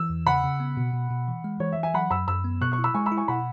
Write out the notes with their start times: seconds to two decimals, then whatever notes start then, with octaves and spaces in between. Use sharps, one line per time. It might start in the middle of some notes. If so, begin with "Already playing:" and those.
Already playing: E3 E6
0.10 E2
0.26 C#3 F#5 B5
0.44 C#3
0.60 B3
0.77 B2
0.94 B2
1.10 B2
1.28 E3
1.44 G#3
1.60 E3 C#5
1.72 E5
1.77 E3
1.83 E5 G#5
1.94 F#3 F#5 B5
2.11 F#2 B5 E6
2.28 F#2 B5 E6
2.45 B3
2.61 B2 C#6 F#6
2.72 C#6 F#6
2.78 E4
2.84 B5 E6
2.94 G#3 G#5 C#6
3.06 B5 E6
3.12 E4
3.17 G#5 C#6
3.28 B2 F#5 B5